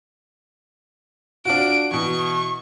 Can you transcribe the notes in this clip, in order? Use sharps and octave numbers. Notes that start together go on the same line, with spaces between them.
D4 F4 F#4 D7
B2 E3 C#6